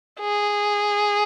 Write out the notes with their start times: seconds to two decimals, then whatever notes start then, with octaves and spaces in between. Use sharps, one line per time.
0.20 G#4